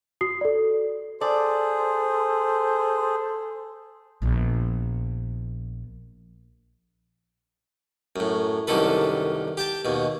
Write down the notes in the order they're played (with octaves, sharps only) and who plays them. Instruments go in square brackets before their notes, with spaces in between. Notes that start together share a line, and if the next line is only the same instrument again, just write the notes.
[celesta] F#4 D#6 C7
A4 D5
[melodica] G#4 [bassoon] A4 [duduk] C5 [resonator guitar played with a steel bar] D5
[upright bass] A#1 B3
[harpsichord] F#2 A2
C2 F#2 D3 D#3 A4 B4
G4 G5 A5
D#2 B2